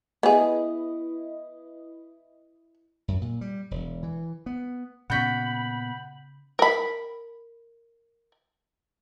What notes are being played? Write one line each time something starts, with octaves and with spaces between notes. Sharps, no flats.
B3 E4 G#4 B4 D#5
F#2
A#2
G3
E1
E3
B3
A#2 C#3 B3 F#4 F#5 B5 G6 B6
A#4 B5